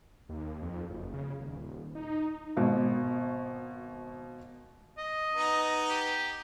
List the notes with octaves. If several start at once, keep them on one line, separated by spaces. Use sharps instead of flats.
D#2
F2
F#1
C#3
D#1
D#4
G#1 B2
D#5
B3 D#4
G4